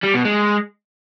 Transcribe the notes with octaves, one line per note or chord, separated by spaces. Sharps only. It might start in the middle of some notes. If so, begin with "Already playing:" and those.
G3
B2
G#3